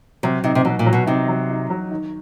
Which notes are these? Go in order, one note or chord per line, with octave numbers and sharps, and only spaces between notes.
C3 F#3
C3 D#4
C3
B2 F#3
A#2
F#3
B2
C3 D#4
F#3
D#4
F#3
D#3